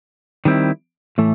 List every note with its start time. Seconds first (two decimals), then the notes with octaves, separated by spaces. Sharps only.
0.45 D#3 G3 C4 E4
1.18 A2 E3 A3